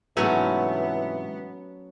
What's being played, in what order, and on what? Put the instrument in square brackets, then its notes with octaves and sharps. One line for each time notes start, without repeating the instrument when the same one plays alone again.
[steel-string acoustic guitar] G#2 C3 F#5 [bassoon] E3 [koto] F#3 A3 C#4 [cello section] B3